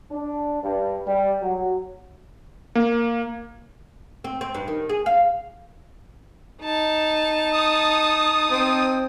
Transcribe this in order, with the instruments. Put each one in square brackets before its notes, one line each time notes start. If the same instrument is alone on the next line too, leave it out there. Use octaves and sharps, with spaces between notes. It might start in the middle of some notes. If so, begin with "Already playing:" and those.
[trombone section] D4
G2
G3
F#3
[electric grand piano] A#3
[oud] C4
C4
G2
D#3
G#4
F5
[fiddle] D#4 A5
[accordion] D#6
[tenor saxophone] C4